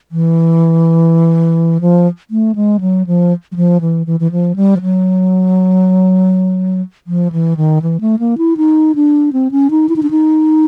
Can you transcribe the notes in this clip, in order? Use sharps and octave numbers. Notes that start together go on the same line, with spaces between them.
E3
F3
A3
G#3
F#3
F3
F#3
F3
E3
E3
E3
F3
G3
F3
F#3
F3
E3
D#3
E3
A3
A#3
E4
D#4
D4
C4
C#4
D#4
E4
D#4
D4
D#4